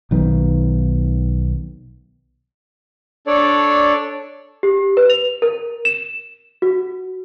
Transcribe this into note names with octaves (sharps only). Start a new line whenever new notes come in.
B1 D#3 B3
D4 A4 C#5 D5
G4
B4
F7
A#4
E7
F#4